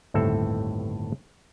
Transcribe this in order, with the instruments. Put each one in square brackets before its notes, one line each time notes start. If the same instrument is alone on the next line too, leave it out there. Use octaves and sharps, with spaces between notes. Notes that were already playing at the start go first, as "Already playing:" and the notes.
[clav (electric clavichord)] G1 D#2 A2 C4 A4 E5